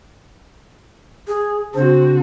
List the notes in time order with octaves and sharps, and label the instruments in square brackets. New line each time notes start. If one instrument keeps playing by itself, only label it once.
[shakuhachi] G#4
[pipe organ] C#3 D4 [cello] C4 F#4 [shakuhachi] C5